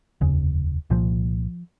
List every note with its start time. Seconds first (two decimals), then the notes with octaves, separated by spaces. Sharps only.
0.21 F1 D#2 C#3
0.90 C2 A#2 F3